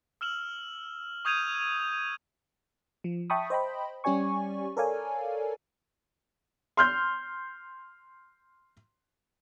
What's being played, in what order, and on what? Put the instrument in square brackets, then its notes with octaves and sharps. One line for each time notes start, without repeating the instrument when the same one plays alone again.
[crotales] E6 F6 E7 F#7
C#6 D#6 G6 G#6 D#7 F7
[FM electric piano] F3
E5 G5 A5 B5 C#6 D#6
C5 D#5 G5 B5
G3 C#4 G4 D5 G#5 C#6
A4 A#4 C#5 D5 F5 G#5
[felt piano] C6 F6 G6